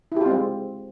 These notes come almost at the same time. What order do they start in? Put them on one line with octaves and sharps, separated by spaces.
E4 G4 F4 C4 G#3